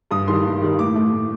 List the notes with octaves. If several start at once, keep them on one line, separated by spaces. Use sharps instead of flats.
G2 D#6
D#3 G3 C6
G2
D#3 G3
A2 D6
A3
A2